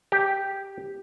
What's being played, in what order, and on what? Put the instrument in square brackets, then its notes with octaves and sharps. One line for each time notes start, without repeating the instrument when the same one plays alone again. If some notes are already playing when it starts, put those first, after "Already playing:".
[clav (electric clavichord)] G4